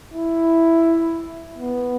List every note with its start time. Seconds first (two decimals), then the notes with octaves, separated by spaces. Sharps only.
0.14 E4
1.57 B3